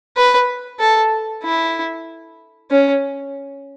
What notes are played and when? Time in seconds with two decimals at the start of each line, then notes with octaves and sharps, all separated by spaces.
0.17 B4
0.80 A4
1.43 E4
2.71 C#4